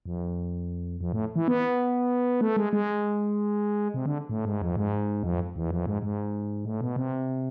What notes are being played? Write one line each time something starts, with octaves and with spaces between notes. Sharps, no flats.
F2
F2
A2
E3
B3
A3
G#3
G#3
C3
D3
A2
G#2
F2
G#2
F2
E2
F2
G#2
G#2
A2
B2
C3